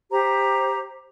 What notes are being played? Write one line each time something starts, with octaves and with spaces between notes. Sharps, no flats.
G4 C5 A#5